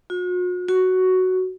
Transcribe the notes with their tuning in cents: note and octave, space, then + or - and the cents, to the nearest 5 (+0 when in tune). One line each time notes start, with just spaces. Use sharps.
F#4 -45
F#4 +5